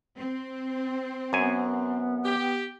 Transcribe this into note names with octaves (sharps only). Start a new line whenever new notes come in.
C4
F#2 B3 G#5
G4